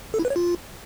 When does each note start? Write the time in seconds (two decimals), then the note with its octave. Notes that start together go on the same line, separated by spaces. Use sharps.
0.14 A4
0.19 E4
0.25 B4
0.30 C#5
0.36 F4